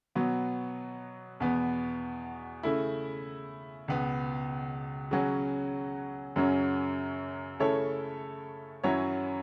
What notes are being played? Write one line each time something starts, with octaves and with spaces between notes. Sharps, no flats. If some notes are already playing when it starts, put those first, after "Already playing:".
B2 F#3 B3
E2 B2 B3
C#3 A3 E4
C#2 B2 B3
C#3 F#3 C#4 F#4
F#2 C#3 F#3 C#4
C#3 A3 E4 A4 C#5
F#2 F#3 C#4 E4 C#5